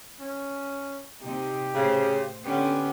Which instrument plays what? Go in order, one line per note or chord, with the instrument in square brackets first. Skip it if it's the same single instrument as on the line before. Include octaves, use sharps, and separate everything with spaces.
[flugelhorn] C#4
[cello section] C3 D#4 [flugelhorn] G4
[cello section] A2 C5 [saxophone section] C#3
[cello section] D3 C#4 [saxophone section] B3 G4